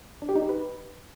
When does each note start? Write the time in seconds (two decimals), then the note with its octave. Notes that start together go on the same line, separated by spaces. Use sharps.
0.22 D4
0.29 G4
0.36 D#4
0.42 G4
0.49 B4